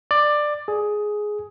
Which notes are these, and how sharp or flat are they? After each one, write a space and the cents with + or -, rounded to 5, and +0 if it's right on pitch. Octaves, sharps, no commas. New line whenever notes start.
D5 +15
G#4 +10